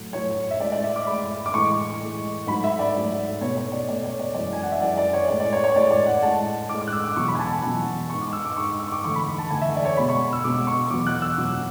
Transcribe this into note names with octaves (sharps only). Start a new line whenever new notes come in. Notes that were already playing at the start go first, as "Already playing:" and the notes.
Already playing: A2 F#3 A3
A2 F#3 A3 C#5
E5
A2 G#3 D5
D5
E5
D6
A2 G#3 B5
D6
A2 E3 G#3 C#6
A2 E3 G#3
G#2 F#3 A3 B5
E5
D5
G#2 F#3 A3
B2 A3 C#5
C#5
D5
B2 A3 D5
C#5
D5
F#2 E3 G#3 D5
G#5
F#5
E5
F#2 E3 G#3 D5
D5
C#5
A2 G#3 D5
D5
C#5
C#5
A2 G#3 D5
D5
F#5
A2 G#3 A5
A2 G#3 D6
D6
F#6
E6
D6
E2 B2 F#3 C#6
B5
G#5
A5
G#5
E2 B2 F#3 A5
G#2 G#3 C#6
D6
E6
D6
G#2 G#3 C#6
E6
C#6
D6
E2 D3 A3 C#6
B5
A5
E2 D3 A3 G#5
E5
D5
C#5
B2 G#3 B5
C#6
E6
B2 G#3 D6
C#6
E2 B2 F#3 D6
F#6
E6
E2 B2 F#3 D6